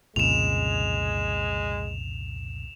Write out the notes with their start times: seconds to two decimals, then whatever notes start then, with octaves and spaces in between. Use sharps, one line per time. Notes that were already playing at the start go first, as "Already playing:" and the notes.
0.16 C2 F2 A#2 C#3 G#3 E7 F7